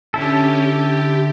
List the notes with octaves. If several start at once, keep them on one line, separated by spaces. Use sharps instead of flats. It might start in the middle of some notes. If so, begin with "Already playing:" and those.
D3 C#4 E4 G4 A4
G4